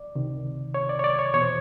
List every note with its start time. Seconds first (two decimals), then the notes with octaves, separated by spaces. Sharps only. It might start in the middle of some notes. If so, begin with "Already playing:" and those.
Already playing: D5
0.15 C#2 C3 D#3
0.74 C#5
0.89 D5
0.99 C#5
1.04 D5
1.19 C#5
1.34 E2 B2 C#5
1.42 C5